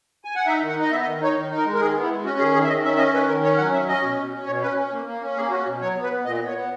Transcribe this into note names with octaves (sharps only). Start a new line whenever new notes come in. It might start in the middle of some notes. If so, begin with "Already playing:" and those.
G#5
F#5
D#4 E5
D#3
F#5
D#4
D#5
B3 E5
D#5
D#3
D#4 C#5
D#3
D#4
A#4
G#3
A#4
D#3 G#4
B3
E4
G#3
C#4 F#4
D#3 G#4
D#3 G#4
E5
D#3 D#5
C#4 E5
E5
C#4 D#5
D#3 B4
D#3 A#4
C#4 C#5
F#3 F#5
C#4 E5
C#4 D#5
B2
B2
C#4
B2 C#5
C#4 B4
C#4
A#3
A#3
C#4
A#3 G#4
C#4 F#4
B2
F#3 C#5
B3
B4
B3
A#2 D#5
B3
C#5
B3